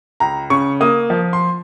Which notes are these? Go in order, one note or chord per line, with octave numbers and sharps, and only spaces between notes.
C#2 A#5
C#3 C#6
A#3 D#6
F3
C6